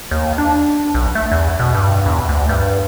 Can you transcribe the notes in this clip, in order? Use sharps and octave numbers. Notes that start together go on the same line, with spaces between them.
D#2
D4
B1
A3
E2
B2
G2
E2
D2
G2